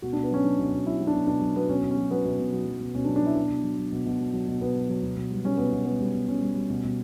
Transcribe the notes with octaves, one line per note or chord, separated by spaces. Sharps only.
B2 F#4
B2 D4
B3
F#3 C#4
F#3 D4
B2
B2
F#3 E4
F#3
D4
B2
B2 D4
F#3
F#3 B3
B2 C#4
B2
C#4
F#3
F#3 B3
B2
B2
F#3
F#3
B2
B2 C#4
D4
F#3
D4
F#3 E4
B2 D4
B2
F#3
F#3
B2
B2
F#3
F#3
B2
B2 B3
F#3
F#3
B2
B2
G3
G3 C#4
B2 B3
B2
G3 B3
G3
B2
B2 C#4
G3
G3
B2
B2